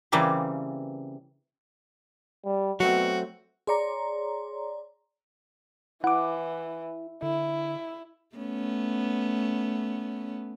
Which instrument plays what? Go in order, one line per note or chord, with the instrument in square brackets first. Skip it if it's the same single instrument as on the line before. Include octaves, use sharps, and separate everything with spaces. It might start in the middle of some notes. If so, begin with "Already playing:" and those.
[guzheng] C#3 E3 G3 A#3 C4
[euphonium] G3
[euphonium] B2 [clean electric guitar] F#3 A3 C4 [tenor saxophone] F#4
[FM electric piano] G#4 D5 A#5 [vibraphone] C#5 C6
[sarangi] E3 [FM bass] E4 [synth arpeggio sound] F#5 D6
[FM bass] D3 [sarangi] E4
[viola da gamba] A3 B3 C#4